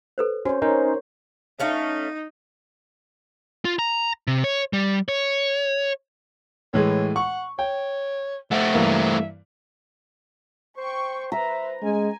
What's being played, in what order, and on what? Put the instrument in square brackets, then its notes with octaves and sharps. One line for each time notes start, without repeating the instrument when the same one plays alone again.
[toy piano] A4 B4 C5
[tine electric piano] C#4 [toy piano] F#4 [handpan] C5 C#5
[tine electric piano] C#4 D#4 C5 [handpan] A#4
[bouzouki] A3 C#4 F5 [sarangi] D#4
[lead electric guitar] F4
A#5
C3
C#5
G3
C#5
[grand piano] A2 E3 G#3 [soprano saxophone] C#5
[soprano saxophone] F#5 [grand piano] C#6
[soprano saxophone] C#5 [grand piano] G5
[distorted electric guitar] A3 C4 [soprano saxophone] E5 [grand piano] F#5
[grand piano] G2 E3 A#3
[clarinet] C5 [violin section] G5 C#6
[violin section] B4 C5 [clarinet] E5 [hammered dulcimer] A#5
[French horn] G#3 [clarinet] C#4 [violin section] G#5